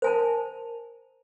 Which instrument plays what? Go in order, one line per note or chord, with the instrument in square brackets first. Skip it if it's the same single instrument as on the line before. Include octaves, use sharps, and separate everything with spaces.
[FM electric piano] A#4 [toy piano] C5 G#5 A5